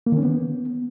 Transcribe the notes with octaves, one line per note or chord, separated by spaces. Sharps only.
A#3
D#3
C#4
B3